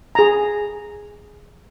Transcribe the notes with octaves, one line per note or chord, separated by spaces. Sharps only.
G#4 A#5